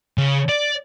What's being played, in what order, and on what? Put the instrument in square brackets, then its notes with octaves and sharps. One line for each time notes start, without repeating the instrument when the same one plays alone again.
[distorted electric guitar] C#3
D5